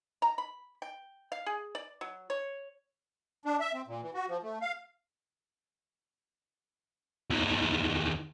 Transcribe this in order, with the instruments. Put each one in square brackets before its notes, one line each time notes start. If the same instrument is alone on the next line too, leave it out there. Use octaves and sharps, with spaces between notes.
[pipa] A#5
B5
G5
F5
G#4
D5
F#3
C#5
[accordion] D4
E5
C4
A#2
E3
F#4
F3
A3
F5
[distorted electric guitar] E2 D#3